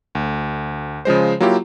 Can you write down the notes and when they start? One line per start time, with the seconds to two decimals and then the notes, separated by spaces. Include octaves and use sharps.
0.15 D2
1.05 C#3 F3 G#3 C5
1.40 F#3 A#3 E4 F4 G4